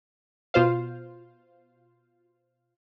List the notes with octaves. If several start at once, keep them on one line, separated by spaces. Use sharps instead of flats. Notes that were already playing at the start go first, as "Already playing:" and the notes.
B2 F4 C5 F5